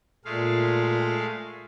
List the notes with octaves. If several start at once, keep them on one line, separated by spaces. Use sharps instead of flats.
A#2 G#3 A3 F5